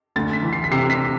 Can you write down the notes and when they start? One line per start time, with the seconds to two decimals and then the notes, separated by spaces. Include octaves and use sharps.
0.16 D2 A6
0.33 B6
0.43 E3
0.53 C7
0.64 B6
0.71 C3 C7
0.90 B6